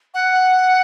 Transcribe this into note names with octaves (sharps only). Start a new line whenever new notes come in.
F#5